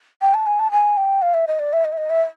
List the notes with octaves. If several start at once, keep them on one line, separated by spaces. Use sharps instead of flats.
G5
A5
G#5
A5
G#5
G5
F5
E5
D#5
D5
E5
D#5
E5
D#5
E5